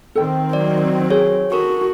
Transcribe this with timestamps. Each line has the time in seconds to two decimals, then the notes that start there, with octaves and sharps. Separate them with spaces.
0.15 D#3 C4 A4 G5
0.53 F#3 D5
1.10 G#4 C#5
1.52 F#4 A4 A#4 C#6